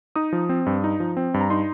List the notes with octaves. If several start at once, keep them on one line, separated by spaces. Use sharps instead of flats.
D#4 D#6
F3
C4
G2
D#4
F3
C4
G2
A#5
D#4 C6